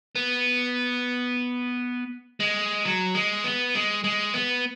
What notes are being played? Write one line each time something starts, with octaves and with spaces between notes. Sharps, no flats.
B3
G#3
F#3
G#3
B3
G#3
G#3
B3